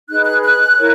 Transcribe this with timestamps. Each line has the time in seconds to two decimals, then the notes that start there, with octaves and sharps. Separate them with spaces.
0.08 D#4 G#4 B4 F#6
0.25 F#6
0.43 F#6
0.76 E4 A#4 C#5